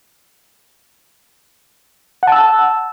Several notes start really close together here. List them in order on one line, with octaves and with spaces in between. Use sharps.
F#5 A5 E6